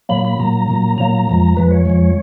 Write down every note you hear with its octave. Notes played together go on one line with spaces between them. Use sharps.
A#2 F#3 A#3 B5
B5
A#2 F#3 A#3 A#5
A#2 F#3 A#3
A#2 F#3 A#3 A#5
F2 F3 G#3
F2 F3 G#3 B4
C#5
F2 F3 G#3